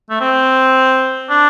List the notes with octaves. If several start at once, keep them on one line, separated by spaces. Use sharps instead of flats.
A3
C4
D4